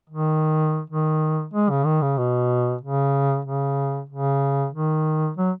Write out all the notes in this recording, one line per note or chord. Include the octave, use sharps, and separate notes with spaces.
D#3
D#3
G#3
C#3
D#3
C#3
B2
C#3
C#3
C#3
D#3
F#3